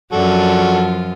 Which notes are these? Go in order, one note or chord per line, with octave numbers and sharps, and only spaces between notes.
F#2 F3 D4 F4 F#4 A4